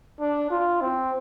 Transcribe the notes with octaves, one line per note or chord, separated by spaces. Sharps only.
D4
F4
C4